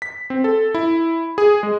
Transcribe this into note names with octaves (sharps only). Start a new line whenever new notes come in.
B6
C4
A4
E4
G#4
G#3